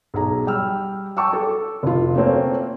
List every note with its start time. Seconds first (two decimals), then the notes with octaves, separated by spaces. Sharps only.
0.14 B1 G#4 A#5
0.47 G3 G5 E6 F6
1.17 G5 A5 C#6 D6 E6
1.33 A4
1.83 F1 F4
2.16 A3 A#3 C4 C#4